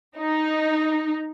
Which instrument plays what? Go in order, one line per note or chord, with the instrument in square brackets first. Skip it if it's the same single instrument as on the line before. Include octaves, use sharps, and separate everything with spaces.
[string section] D#4